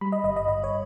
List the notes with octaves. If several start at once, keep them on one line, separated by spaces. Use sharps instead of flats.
G3 B5
D#5
G1 D#5
D#5
G1 D#5
C#5